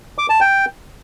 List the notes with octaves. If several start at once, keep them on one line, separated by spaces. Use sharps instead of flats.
D6
A5
G5